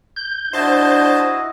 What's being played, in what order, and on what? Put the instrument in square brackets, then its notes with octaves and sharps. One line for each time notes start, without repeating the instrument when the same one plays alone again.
[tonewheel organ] G6
[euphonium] D4 [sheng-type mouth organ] E4 F#4 D#5 [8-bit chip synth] C5 A5